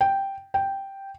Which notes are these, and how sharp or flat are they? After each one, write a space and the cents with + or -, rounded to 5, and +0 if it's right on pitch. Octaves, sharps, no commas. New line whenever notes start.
G5 +0
G5 +0